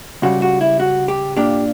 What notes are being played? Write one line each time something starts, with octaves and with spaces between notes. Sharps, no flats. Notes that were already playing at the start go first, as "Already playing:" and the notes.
C#2 C#3 G3 F#4
F#4
E4
F#4
G4
A#2 A#3 D4 G4